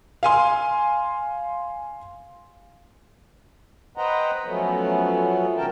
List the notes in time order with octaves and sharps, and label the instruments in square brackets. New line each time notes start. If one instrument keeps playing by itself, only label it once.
[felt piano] F5 G#5 C6
[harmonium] B4 C5 D#5 F#5 G5 A#5
F3 F#3 A3 B3 C#4
B2 D#3 C#4 A#4 G5 A5